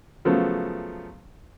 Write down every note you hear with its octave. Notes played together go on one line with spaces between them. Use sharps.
C#3 F3 F#3 A3 B3